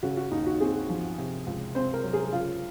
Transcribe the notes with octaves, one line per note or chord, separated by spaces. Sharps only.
C#3 F#4
F#4
D#2 D#4
F#4
C4 G#4
F3
C3
C#2
C4 C5
A#4
F#3
G#4
C#3 F4